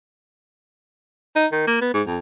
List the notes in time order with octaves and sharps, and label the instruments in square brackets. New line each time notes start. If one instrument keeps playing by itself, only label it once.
[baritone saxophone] D#4
D#3
A#3
B3
G#2
F2